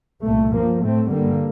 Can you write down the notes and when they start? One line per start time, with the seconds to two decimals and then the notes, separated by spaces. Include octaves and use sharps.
0.24 C2 A#2 A3
0.53 G2 F3 A#3
0.82 A2 A3 C4
1.11 G2 D3 G3 A#3